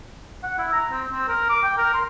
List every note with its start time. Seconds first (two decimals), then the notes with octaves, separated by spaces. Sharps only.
0.43 F#5
0.59 E4
0.73 A#5
0.91 C4
1.11 C4
1.28 A#4
1.49 D6
1.64 G5
1.78 A#4
1.94 C6